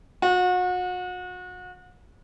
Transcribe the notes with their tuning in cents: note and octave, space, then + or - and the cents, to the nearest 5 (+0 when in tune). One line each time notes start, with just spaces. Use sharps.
F#4 -35